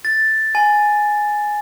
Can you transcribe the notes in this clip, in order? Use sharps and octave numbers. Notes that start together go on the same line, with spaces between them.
A6
G#5